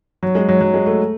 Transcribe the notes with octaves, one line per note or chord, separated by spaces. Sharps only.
F#3
G#3
F#3
F#3
G#3
A3